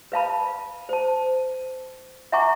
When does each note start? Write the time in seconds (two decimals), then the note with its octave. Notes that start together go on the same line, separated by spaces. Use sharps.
0.12 B4 F5 A5 B5
0.89 C5 A5
2.32 E5 F#5 G#5 A#5 C#6 D6